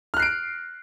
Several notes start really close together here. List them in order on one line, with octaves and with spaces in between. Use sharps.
F6 F#6 C7 D7